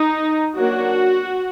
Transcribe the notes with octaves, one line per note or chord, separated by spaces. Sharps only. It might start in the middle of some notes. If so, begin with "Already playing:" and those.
Already playing: D#4
F#3 A#3 D4 F#4